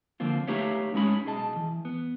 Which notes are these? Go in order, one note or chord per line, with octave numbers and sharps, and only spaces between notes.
D3 F3 A#3 C4 F4
A3 D#4 G4 B4 C#5 F5
F#2 G#3 C#4 D#4 C#5 B5
B1 G#4 D#5 A5
E3
B3